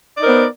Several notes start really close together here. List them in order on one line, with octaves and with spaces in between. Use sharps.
D5 D#4 A#4 C5 B3